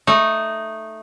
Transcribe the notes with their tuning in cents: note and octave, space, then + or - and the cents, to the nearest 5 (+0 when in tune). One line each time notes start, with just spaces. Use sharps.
A3 +0 D#4 -5